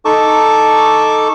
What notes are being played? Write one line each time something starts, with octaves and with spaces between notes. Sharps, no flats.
D#4 A4 A5 C#6 D6